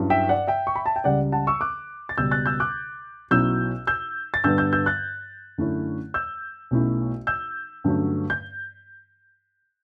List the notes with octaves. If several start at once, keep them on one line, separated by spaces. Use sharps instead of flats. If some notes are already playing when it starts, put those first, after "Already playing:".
Already playing: G2 F#3 C#4 E4
E5 G5
D5 F#5
E5 G5
C#6
B5
A5
G5
C#2 C#3 G3 D5 F#5
F#5 A5
C#6 E6
D6 F#6
A6
C#2 B2 G3 E6 G6
F#6 A6
E6 G6
D6 F#6
B1 B2 F#3 C#4 E4 E6 G6
E6 G6
A6
G2 D3 G3 B3 E6 G6
E6 G6
E6 G6
F#6 A6
F#2 D3 A3 C#4 E4
E6 G6
B1 B2 A3 C#4 E4
E6 G6
G2 D3 F#3 A3 C#4
G6